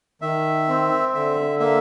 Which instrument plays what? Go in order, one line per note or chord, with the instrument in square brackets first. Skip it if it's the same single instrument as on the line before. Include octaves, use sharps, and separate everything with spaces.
[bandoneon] D#3 E5
C4
D3 E5
A#3 E5